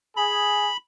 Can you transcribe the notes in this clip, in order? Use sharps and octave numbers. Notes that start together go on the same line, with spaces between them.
G#4 B5